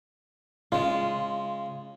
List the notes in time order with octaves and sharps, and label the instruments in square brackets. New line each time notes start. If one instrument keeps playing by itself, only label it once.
[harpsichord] C#3 G#3 [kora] F4